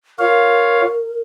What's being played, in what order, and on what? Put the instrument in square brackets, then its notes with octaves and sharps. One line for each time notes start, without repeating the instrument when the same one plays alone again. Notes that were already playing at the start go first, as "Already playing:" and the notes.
[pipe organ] F4 C#5 F5 [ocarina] A#4